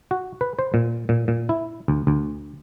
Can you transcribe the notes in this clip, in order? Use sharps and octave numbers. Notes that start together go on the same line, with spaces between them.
F#4
B4
C5
A#2
A#2
A#2
E4
D2
D2